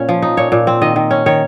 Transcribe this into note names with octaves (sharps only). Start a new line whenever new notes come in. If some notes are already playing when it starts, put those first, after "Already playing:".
Already playing: A#2 C#4 C#5
F3
D#4
A#2 C#5
A#2
C4
D#3 D#5
D#3
C#4
D#3 C#5